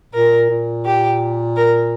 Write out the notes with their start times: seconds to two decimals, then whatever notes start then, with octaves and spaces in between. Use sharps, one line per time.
0.13 A#2 A#4
0.50 A#2
0.86 G4
1.56 A#4